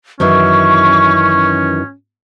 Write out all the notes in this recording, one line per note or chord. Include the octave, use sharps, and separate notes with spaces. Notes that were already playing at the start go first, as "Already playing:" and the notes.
F#2 D#3 E3 C#4 C#6